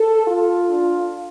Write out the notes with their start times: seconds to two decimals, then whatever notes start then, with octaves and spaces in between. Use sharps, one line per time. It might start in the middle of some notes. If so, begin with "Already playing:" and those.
Already playing: A4
0.25 F4
0.69 D4